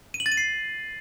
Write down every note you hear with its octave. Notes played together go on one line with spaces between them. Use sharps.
D#7
F#7
A6
D#7
C7